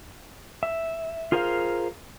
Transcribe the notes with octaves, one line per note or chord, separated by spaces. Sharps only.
E5
F4 G#4 A#4 C5 E5 F5